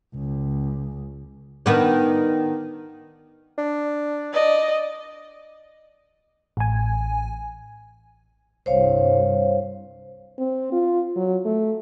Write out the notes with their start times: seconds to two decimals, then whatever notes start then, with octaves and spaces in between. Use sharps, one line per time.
0.15 C#2
1.66 D#3 B3 D4
3.58 D4
4.33 D5 D#5
6.57 A1 G#5
8.66 C2 G2 C5 C#5 F5
10.39 C4
10.72 F4
11.16 F#3
11.45 A3